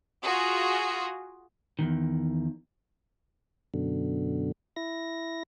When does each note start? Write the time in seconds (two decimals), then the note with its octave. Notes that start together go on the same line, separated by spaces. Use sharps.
0.23 F4 F#4 G#4
1.79 E2 G2 D#3
3.74 F#2 B2 D3
4.76 E4 A#6